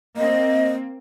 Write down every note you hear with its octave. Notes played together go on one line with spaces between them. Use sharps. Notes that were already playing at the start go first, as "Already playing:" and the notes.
A#3 C4 D#5